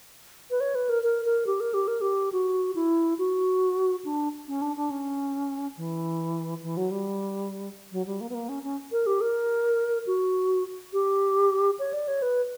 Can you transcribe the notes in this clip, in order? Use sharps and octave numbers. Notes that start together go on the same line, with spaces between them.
B4
C#5
B4
A#4
A#4
A#4
G4
A#4
G4
A#4
G4
F#4
E4
F#4
D4
C#4
D4
D4
C#4
E3
E3
F#3
G3
F#3
G3
A#3
B3
A#3
C#4
C#4
A#4
G4
A#4
F#4
G4
C#5
D5
C#5
B4